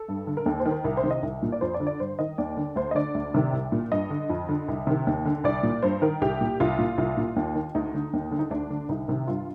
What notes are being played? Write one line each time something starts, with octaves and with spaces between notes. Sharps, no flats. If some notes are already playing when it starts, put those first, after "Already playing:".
Already playing: A4
G2
D3
A#4
D#2 A4
C5
D#3
A#4
C2 A#4
C5
C3 D#3
D#5
C2
A#2
D5
F2 C5
D5
D3
D5
G2 C5
D#3 D#5
D#2 D5
D3
D2 C5
D#5
D3 D5
D2
C3 D#3
C2
A#2
G2 D#5
D3
F2
D3
C2
C3 D#3
D#2
D3
C2 D5
A#2
G2 C5
D#3 A#4
C2 G4
A#2
C2 F4
A#2
C2
A#2
D#2
D#3
D2 D#4
D3
D#2
D3
D#4
D2 D4
D3
C2 D#4
C3 D#3
G2 F4